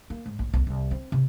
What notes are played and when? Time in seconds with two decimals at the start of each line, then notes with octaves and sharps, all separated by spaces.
0.10 A#3
0.26 G#2
0.39 A#1
0.54 B1
0.67 C2
0.91 C4
1.12 C3